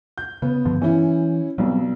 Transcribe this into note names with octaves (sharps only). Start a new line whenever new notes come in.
G6
C#3 B3
G2 D3 F3
E3 C#4 E4
B1 F#3 G3 C4